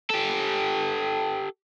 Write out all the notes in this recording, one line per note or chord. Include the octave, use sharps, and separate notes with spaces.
G4 A4